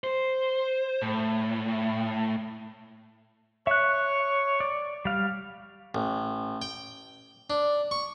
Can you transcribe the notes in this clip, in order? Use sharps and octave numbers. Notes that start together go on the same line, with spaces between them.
C5
A2
C#5 E5 F#6
D5
G3 F5
A1
G5
D4
C#6